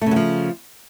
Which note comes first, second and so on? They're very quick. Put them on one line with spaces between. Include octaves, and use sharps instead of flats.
A3 C#3 F#3 F3